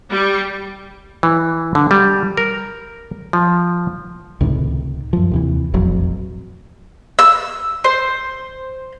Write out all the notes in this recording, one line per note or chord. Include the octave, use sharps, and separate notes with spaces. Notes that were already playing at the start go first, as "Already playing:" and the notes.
G3
E3
D3
G3
A#4
F3
C#2 A2 C3 D#3
F#2 F3
D#2 C3 E3
E1 A1 F2 F#3
E6
C5